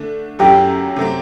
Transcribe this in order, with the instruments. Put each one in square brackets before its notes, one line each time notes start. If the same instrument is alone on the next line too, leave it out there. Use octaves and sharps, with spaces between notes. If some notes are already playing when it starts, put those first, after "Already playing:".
Already playing: [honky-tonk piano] D3 A3 D4
[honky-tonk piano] F#2 F#3 A3 E4 [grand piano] G4
[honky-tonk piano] C3 F#3 A3 C4